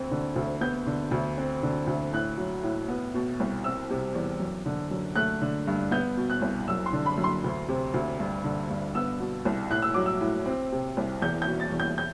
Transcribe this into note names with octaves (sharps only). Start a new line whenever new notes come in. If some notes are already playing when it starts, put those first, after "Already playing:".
Already playing: D2 C4
D3
D2
B3 G6
D3
D2
C4
D3
D2
A2 F#6
F#3
A2
B3
B2
C2
C4 E6
C3
E2
F#2
D3
F#2
A3 F#6
D3
G2
B3 G6
B2
F#6
C2
F#2 E6
C6
D3
B5
F#2
C6
D2
C3
D2
G2
D3
G2
B3 E6
B2
C2
A2 F#6
E6
F#3 D6
E6
A2
C4
C3
C2
E2 G6
G6
B2
A6
E2
G6
G6